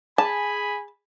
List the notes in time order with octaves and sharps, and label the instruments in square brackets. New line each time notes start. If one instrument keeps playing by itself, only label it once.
[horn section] G#4 G#5 B5 [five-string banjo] A5